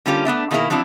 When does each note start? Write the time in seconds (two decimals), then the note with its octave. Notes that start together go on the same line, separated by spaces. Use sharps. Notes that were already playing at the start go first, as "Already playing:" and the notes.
0.06 D3 G3 A#3 C#4 F4 G4
0.25 A3 B3 D4 E5
0.51 B2 D#3 A#3 E4 G#4 A#4
0.70 F3 F#3 C4 D4 E4